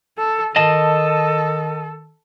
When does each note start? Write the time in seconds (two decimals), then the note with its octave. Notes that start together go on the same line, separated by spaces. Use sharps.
0.18 A4
0.56 D#3 A4 D#5 A5